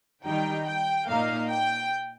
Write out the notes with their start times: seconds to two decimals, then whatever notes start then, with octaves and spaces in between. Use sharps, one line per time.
0.24 D#3 G3 D#4 G5
0.66 G5
1.08 A#2 A#3 D#4 F5
1.50 G5